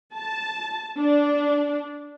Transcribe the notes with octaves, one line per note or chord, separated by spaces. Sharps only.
A5
D4